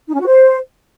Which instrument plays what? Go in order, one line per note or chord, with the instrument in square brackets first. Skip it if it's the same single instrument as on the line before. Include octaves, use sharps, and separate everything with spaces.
[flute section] D#4
C#4
F#4
C5